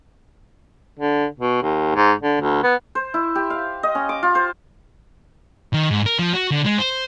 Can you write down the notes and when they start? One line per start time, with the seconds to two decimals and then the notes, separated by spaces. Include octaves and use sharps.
0.99 D3
1.40 B2
1.63 D#2
1.95 G#2
2.22 D3
2.41 D2
2.63 B3
2.95 C5
3.14 E4
3.35 G4
3.50 F5
3.83 D#5
3.95 C#4
4.09 D6
4.23 F4
4.35 C5
5.74 D#3
5.90 G#2
6.06 A#4
6.19 F3
6.33 F#4
6.51 D3
6.66 G#3
6.78 C5